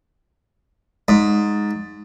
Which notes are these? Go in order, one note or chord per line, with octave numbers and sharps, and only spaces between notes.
G#2